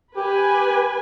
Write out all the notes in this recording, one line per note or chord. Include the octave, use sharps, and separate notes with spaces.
G4 B4 G#5